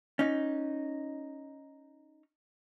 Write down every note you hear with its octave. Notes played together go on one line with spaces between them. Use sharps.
C#4 D#4